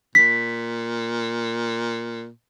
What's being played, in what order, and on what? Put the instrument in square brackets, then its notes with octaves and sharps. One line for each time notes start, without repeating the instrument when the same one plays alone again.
[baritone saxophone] A#2 [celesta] B6